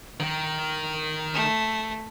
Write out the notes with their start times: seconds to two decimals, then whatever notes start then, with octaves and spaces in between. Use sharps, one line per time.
0.20 D#3
1.34 A3